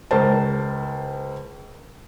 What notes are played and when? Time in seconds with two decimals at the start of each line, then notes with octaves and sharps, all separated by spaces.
0.11 C#2 A#4 C5 A5